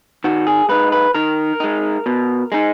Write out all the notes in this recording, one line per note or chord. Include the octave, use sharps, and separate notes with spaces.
D#3 F#4
G#4
G#3 D#4 B4
B4
D#3 A#4
G#3 D#4
B2
G#3 D#4